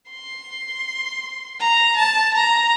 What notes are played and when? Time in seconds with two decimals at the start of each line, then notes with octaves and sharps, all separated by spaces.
0.10 C6
1.60 A#5
1.97 A5
2.34 A#5